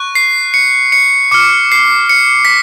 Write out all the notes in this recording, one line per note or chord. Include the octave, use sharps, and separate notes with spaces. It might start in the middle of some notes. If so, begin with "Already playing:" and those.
Already playing: C#6 F#6
C7
C#7
C#7
D6 F6 C#7
C7
C#7
B6